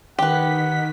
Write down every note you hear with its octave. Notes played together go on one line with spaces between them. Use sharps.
D#3 G4 B4 F#5 B6